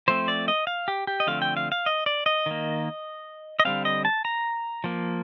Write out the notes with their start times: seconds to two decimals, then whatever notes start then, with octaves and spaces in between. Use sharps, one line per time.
0.08 F3 A3 C4 C5
0.28 D5
0.48 D#5
0.67 F5
0.88 G4
1.07 G4
1.20 D#5
1.27 D3 F3 A3 C4 F5
1.42 G5
1.57 F5
1.72 F5
1.86 D#5
2.06 D5
2.26 D#5
2.46 D#3 A#3
3.60 D#5
3.65 D3 G3 C4 F5
3.85 D#5
4.05 A5
4.25 A#5
4.84 F3 A#3